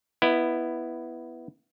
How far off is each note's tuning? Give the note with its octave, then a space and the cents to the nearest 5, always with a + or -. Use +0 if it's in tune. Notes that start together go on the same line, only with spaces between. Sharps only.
B3 +0 E4 +5 D#5 -25